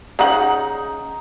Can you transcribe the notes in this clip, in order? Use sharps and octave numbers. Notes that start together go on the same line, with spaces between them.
C#3 D#4 F#5